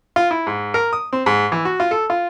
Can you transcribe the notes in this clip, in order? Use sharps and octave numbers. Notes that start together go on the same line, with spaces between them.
F4
E4
G#2
A#4
D#6
C4
G#2
E3
F#4
F4
A4
F4